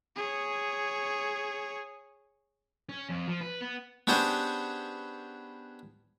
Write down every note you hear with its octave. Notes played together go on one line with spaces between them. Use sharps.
G#4 C#5
C#4
F2
F3
B4
B3
B3 C#4 D4 G4 G#4 C5